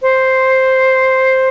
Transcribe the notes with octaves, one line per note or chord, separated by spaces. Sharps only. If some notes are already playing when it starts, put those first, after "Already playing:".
C5